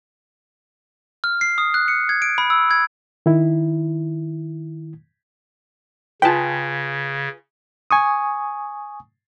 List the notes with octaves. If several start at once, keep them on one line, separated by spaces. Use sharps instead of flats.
F6
C7
D#6
F#6
C#7
G#6
D7
B5
E6
G#6
D#3 E4
C#3 F4 G#4 B4 G5 A5
G#5 C#6 D#6